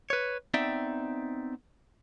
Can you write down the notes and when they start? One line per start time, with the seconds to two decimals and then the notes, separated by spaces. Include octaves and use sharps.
0.10 B4 C#5
0.54 B3 C4 D#4 D5 E5 G5